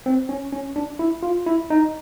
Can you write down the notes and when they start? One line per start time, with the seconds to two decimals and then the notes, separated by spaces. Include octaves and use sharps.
0.06 C4
0.29 C#4
0.52 C#4
0.76 D4
0.99 E4
1.23 F4
1.47 E4
1.70 D#4